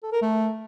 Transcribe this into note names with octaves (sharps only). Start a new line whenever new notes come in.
A4
A#4
A3